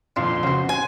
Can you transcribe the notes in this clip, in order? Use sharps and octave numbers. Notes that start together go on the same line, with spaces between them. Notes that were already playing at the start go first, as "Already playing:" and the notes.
F2 A#2 D3 C4 D4 F4 C6
C#3 B3 F#4 C5
C4 G#5